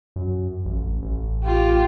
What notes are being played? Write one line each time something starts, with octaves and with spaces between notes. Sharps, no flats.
F#2
A1
A1
F4 G4